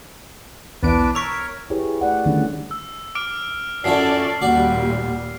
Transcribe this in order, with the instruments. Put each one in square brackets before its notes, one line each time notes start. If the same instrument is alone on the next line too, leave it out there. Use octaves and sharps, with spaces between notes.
[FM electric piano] B1 B3 E4 [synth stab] E2 D7 [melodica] D4 B4 A5
[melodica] A#4 C#5 [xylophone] A#5 C#6 B6 [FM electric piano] E6
[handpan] E4 G4 G#4 B4 C#5
A3 D5 F#5
D3 D#3 G3 A3 C#4 D#4
[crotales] E6
D6 F6 D7
[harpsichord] F#2 F3 E4 [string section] C#4 A4 D5 [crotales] C7
[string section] D#2 A#2 G3 [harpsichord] F#4 D5